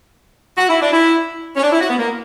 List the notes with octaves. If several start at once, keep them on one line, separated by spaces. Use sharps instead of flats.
F#4
E4
D4
E4
C#4
D4
E4
F#4
B3
A#3